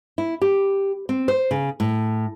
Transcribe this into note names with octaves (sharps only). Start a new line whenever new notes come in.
E4
G4
C4
C5
C#3
A2